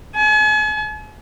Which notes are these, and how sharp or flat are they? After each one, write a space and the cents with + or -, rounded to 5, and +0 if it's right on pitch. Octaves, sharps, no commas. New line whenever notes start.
G#5 +45